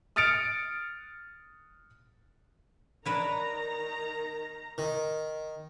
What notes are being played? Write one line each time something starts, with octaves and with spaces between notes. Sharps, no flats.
D#6 F6 A6 C#7 D7 F7
D#3 D4 B4 C#5 A#5
D#3